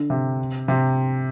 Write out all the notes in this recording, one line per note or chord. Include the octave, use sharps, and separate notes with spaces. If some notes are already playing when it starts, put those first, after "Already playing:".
Already playing: D3
C3
C3